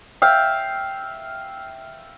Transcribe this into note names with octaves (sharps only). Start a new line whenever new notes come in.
E5 F5 G5